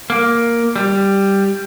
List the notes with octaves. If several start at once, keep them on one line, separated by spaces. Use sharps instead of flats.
A#3
G3